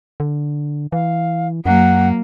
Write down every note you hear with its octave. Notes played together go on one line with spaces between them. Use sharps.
D3
E3 F5
F#2 F#3 A#3 F#5